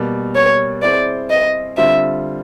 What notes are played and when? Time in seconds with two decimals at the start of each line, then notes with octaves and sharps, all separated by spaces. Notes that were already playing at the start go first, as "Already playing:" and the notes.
Already playing: B2 G3 A#3
0.35 C#5
0.82 C4 E4 G#4 C5 D5
1.30 D#5
1.77 D3 G3 C4 F4 E5